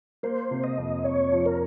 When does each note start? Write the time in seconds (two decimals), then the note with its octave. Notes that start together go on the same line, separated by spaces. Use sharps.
0.23 A#3 C5
0.51 C3
0.64 D#5
0.78 F2
1.04 F2 C#5
1.32 F3
1.46 A#4